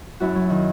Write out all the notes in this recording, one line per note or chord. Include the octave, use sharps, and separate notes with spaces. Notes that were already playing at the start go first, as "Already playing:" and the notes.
F#2 E4 F#4
F#3
D#3